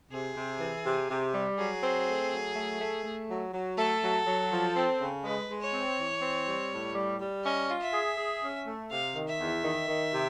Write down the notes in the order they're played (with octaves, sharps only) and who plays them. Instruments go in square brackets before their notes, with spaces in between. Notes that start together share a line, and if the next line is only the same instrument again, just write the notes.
[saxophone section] C3 [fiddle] G#4
[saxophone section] C3
E3
C3
C3
G3
[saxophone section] F#3 [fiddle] G#4
[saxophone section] C4
A3
F#3
A3
A3
A3
F#3
F#3
[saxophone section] A3 [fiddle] A4
[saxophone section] F#3
F#3
F3
C4
C#3
[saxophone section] G#3 [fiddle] B4
[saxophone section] G#3
[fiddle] C#5
[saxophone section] C4
E3
C4
G3
A2
G3
G3
[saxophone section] C#4 [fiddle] D#5
[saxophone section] F4
[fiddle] E5
[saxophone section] G#4
G#4
C#4
A3
[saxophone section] C3 [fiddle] F5
[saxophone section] D#3
[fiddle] E5
[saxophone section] E2
D#3
D#3
C3